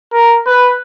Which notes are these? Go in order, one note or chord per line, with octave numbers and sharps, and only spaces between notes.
A#4
B4